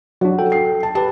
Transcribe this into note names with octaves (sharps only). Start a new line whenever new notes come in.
F#3 D4 F#4
A4 G5
C7
A5
G4 B4 A5